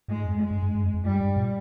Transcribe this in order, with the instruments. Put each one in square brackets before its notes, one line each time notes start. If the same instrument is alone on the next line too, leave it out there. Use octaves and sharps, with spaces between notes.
[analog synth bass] G#2 [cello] G#3
[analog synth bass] F2
[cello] G#3
[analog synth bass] G2
G2
G2
F2
F2
[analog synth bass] G2 [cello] G3
[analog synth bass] G2
A#2